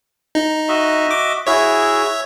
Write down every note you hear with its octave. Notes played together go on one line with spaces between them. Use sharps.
D#4
F#4 D#5 E5
D6
E4 F#4 G#4 C#5 E5